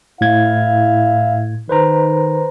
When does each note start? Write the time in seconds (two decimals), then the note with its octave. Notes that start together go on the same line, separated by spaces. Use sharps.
0.21 A2 E4 E5 F5 G#6
1.69 D#3 B4 C5 A#5